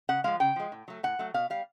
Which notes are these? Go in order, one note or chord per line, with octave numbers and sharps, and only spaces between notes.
C#3 F#5
F3 G#3 F5
C#3 G5
F3 G#3
A2
F#3 A3
A2 F#5
F#3 A3
B2 F5
G3 F5